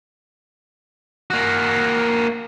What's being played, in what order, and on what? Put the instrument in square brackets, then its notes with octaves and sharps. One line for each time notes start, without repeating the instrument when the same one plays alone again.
[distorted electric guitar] A#3 F#4